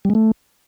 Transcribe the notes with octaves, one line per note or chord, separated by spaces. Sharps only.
G3
G#3
A3